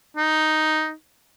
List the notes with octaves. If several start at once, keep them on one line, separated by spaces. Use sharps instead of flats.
D#4